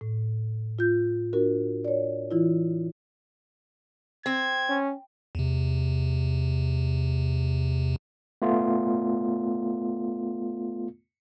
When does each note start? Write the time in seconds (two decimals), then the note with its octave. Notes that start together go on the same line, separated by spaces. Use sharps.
0.01 A2
0.79 F4 G6
1.33 D4 F#4 A#4
1.85 C#5 D5
2.31 E3 E4 F4
4.26 C4 G#6
4.69 C#4
5.35 E2 C3
8.42 A3 B3 F4